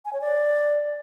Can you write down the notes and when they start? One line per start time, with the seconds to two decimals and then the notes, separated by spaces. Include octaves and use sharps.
0.05 G#5
0.13 C#5
0.21 D5